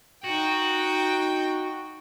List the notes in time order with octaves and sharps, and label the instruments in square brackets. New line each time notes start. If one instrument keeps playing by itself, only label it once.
[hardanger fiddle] D#4 G5 [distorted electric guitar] F#4